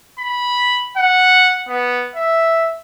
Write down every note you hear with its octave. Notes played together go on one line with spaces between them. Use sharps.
B5
F#5
B3
E5